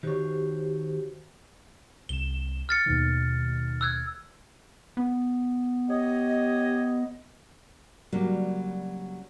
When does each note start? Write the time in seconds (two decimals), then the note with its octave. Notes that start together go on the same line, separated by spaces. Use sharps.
0.03 D#3 F#4 G4 C5 C#5
2.09 C2 E7 G7
2.69 F6 A6 C#7
2.86 D#2 B2 D#3
3.81 E6 F#6 G#6
4.97 B3
5.89 G4 C#5 D#5
8.12 C#3 F#3 G3 A#3 D4